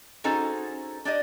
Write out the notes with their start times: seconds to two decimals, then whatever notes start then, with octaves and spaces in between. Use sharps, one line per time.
0.24 C#4 D#4 F#4 G#4 A4 C5
1.05 D4 G4 D5 D#5